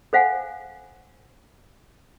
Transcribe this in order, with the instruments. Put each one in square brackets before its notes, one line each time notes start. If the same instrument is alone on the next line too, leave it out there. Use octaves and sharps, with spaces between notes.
[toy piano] A4 C5 F5 F#5 G#5